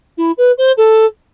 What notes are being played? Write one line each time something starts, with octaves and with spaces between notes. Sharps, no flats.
E4
B4
C5
A4